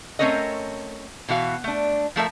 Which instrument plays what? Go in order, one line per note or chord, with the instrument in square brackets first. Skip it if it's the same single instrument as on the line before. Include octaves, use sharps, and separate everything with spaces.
[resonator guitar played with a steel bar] A3 C4 C#4 A#4 C#5 D#5
B2 E3 F#4 F5
A3 D4
F3 A3 A#4 E5